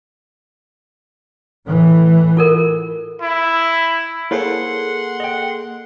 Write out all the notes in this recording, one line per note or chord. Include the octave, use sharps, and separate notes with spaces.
A2 E3
F4 A4 A#4
E4
A#3 E4 G#4 A4 C5 C#5 F#5 C6
D#5 G5